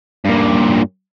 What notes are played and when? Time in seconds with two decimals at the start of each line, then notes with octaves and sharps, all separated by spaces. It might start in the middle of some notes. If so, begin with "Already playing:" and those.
0.25 G2 A#2